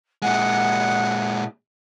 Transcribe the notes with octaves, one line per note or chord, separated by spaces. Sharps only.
A#2 G#3 F#5